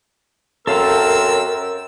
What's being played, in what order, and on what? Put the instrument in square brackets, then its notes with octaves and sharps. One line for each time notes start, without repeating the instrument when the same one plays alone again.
[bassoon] F#2 [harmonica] C4 E6 [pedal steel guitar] A4 F5 A5 [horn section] A#4